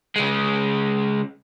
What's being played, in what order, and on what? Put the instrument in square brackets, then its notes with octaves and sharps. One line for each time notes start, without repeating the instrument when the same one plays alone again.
[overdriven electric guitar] C#3 G#3